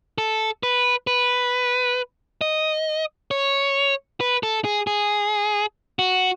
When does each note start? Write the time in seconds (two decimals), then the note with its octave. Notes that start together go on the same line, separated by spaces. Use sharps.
0.18 A4
0.63 B4
1.07 B4
2.41 D#5
3.31 C#5
4.21 B4
4.43 A4
4.65 G#4
4.87 G#4
5.99 F#4